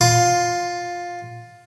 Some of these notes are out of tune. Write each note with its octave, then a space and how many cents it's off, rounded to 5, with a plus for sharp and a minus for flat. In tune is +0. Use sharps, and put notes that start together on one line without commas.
F4 +10 C6 +0